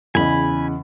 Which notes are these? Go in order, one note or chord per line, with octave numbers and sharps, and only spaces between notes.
E2 C#3 D#5 G#5 B5